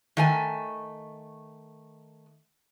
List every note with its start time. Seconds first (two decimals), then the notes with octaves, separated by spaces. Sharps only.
0.17 D#3 A3 G#5